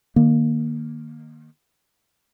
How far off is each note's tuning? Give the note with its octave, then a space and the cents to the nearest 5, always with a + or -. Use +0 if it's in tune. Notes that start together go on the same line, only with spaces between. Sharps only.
D#3 -30 A#3 +0